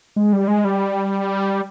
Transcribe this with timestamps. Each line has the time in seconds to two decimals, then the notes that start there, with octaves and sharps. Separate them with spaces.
0.16 G#3
0.33 G3
0.48 G#3
0.65 G3